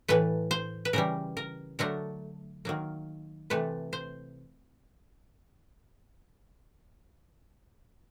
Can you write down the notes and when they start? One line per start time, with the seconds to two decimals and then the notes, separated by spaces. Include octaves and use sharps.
0.08 A2 E3 A3 B4
0.51 C5
0.85 B4
0.93 C#3 E3 G3 A#4
1.37 A#4
1.79 D3 F#3 A3 A#4
2.65 D#3 F#3 A#3
3.50 C3 E3 A3 B4
3.93 C5